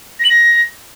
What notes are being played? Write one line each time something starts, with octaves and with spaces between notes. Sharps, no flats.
A#6
F#7
A#6